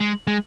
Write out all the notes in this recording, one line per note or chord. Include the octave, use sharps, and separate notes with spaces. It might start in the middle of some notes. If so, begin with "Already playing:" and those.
G#3
G#3